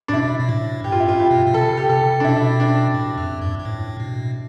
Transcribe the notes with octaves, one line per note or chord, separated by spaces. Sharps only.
A2 D4
B2 E4
B2
A2
G2 G4
F4
E4
G2 F4
G4
B2
B2
C3 A4
G4
C3 A4
D4
B2 E4
D4
A2
F2
G2
G2
A2
B2